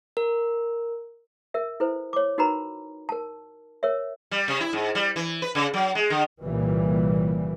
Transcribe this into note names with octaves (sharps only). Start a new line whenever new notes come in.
A#4
A#4 E5
E4 A4 B4 C5
C#5 D6
D#4 F#4 A#4 B4 A#5 B5
A#4 A5
A#4 C#5 E5
G3
C3
E4
G#2
G3
E3
B4
C#3
F#3
G#3
D3
C2 A#2 C#3 E3 G3